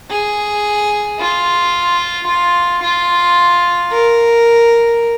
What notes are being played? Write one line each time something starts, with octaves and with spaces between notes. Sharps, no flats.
G#4
F4
F4
F4
A#4